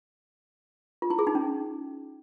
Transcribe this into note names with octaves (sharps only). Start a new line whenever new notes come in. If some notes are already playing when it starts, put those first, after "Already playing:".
F4
E4
G#4
D#4
C#4